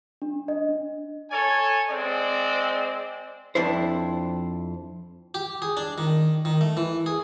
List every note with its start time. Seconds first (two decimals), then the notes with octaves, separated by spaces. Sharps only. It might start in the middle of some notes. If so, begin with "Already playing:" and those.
0.22 D4
0.48 D#5
0.69 D4
1.30 A4 C#5 G#5
1.89 G#3 C4 D5
3.55 F2 D4 E4 C5
5.34 G4
5.62 G#4
5.77 D4
5.98 D#3
6.45 D#3
6.61 A3
6.77 E3
7.06 G#4